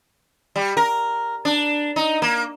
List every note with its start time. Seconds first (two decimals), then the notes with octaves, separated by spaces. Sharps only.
0.56 G3
0.77 A#4
1.45 D4
1.96 D#4
2.22 A#3